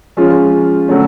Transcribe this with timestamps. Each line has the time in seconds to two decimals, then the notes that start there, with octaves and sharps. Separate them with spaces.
0.17 F3 G#3 C#4 F4
0.88 D3 F#3 A3 C#4